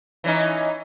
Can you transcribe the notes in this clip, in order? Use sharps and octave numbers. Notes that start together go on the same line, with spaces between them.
E3 C#4 D#4